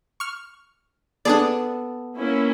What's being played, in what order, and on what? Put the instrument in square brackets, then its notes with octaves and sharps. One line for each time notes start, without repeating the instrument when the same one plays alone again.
[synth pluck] C#6 F6
[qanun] B3 A4 [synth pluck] D4 G#4 D5
[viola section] A#3 C#4 E4